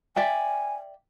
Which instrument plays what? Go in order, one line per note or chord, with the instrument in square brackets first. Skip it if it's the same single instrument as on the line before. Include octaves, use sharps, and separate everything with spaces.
[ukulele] D5 E5 G5 [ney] G#5